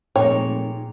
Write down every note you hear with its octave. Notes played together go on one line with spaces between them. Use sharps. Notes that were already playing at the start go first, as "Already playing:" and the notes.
F1 A#2 G#3 D#4 C#5 G5